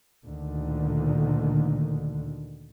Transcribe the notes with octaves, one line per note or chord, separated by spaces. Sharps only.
D2 A#2 D3 D#3